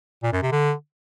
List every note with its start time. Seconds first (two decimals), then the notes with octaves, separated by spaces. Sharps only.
0.23 A#2
0.33 F#2
0.42 C3
0.52 D3